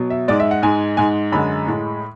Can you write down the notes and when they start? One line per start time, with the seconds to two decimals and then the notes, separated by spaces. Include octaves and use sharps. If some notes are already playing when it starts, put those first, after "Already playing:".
Already playing: B2 F#3
0.10 E5
0.28 G#2 G#3 D5
0.40 E5
0.51 F#5
0.62 G#2 G#3 G#5
0.97 G#2 G#3 G#5
1.32 F#2 D3 G#3 B5
1.67 A2 G#3